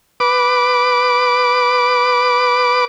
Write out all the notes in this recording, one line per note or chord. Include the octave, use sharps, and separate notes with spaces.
B4 D6